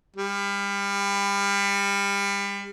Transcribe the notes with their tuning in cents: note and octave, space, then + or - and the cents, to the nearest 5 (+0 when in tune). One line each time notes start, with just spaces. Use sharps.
G3 +30